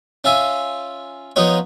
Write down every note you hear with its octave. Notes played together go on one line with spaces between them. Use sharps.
C#4 F4 E5 G#5
F3 B3 D#4 C#5